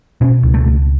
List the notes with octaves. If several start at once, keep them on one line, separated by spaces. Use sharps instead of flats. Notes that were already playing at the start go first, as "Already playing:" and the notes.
B2 C#4
C#2
A3
C#2